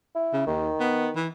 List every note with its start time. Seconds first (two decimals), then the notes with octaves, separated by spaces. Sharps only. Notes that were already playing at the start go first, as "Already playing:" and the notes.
0.15 E4
0.33 C#3
0.47 D#2 D#3
0.80 B3
1.15 E3